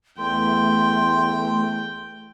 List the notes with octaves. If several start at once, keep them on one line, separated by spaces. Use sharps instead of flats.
E2 A3 G5 C6